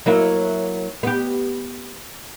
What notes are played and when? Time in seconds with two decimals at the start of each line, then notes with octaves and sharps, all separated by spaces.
0.06 F#3 A#3 E4
1.03 B3 G4